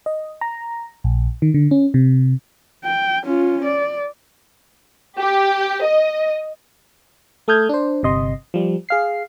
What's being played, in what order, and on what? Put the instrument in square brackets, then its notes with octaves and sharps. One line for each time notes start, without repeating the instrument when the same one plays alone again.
[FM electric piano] D#5
A#5
A#1
D#3
D3
C#4
C3
[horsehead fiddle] G5
C#4 F4
D5
[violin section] G4
D#5
[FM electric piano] A3 A4 D#6 F6 G6 G#6
D4 C5
G1 C3 D#5 C6
F3 G3
G#4 F5 C7